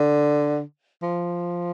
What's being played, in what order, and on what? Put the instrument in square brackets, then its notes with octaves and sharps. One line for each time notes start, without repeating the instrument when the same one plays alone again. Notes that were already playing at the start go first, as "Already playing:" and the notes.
Already playing: [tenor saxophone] D3
F3